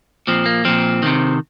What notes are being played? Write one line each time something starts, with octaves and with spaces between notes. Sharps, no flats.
A#2 F3 C4
A#3
A#2 F3 C4
C3 D#3